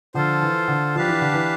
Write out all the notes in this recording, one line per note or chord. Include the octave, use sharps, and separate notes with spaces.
D3 F3 F4 A4 C5
E3
D3
F3 D4 G4 B4 F5 A5
E3
D3
E3